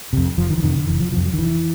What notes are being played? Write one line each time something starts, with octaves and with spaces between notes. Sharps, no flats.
F2 C3
F1 F3
D#3
E3
F2 C3 D#3
D3
F1 E3
F3
F2 C3 F3
F#3
D#3
F1 E3